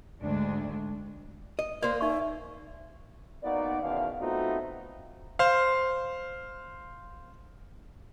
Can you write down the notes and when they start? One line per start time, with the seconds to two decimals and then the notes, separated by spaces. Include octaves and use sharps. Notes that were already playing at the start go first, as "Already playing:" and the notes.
0.20 D2 G#2 G#3 D4
1.59 D#5
1.83 A#3 A#4 C5 D5
2.01 D#4 E5 C#6
3.43 A#3 B3 D#4 F#4 D5
3.82 E2 B2 D#3 C#4 F5
4.20 A3 B3 C4 D#4 F4 F#4
5.39 C5 F5